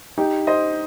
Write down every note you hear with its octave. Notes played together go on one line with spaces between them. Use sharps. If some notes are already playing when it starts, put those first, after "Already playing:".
D#4 G4
C5 D#5